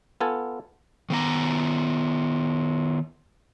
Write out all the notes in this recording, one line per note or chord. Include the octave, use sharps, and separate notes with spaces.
B3 F4 A4 G#5
D#3 B3 A#5